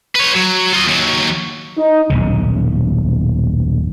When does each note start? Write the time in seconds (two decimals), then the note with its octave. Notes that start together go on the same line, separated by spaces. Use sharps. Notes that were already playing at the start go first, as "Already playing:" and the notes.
0.15 B4 C#5
0.35 F#3
0.73 F4 D#5
0.86 D#2 F#3
1.77 D#4
2.10 D#1 B1 F#2 C#3